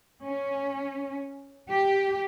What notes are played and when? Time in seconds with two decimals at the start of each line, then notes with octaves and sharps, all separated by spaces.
0.24 C#4
1.71 G4